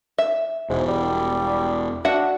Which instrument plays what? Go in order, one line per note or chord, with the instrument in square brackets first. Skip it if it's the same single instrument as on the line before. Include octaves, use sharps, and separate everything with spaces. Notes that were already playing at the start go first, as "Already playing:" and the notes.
[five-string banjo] E5
[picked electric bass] E1 [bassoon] G#2
[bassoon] G3
[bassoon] D4 [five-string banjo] F#4 E5 F#5